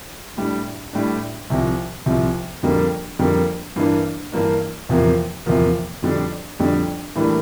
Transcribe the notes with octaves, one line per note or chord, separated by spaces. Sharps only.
A2 G3 D4
A2 G3 D4
C2 C3 F3
C2 C3 F3
F2 D3 G3 A#3
F2 D3 G3 A#3
G2 E3 A#3 D4
G2 E3 A#3 D4
E2 C3 F3 A#3
E2 C3 F3 A#3
F2 D3 G3 D4
F2 D3 G3 D4
A2 E3 G3 A#3 D4